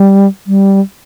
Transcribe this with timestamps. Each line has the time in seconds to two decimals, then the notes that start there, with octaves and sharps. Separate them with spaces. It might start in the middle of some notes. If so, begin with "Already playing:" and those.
Already playing: G3
0.47 G3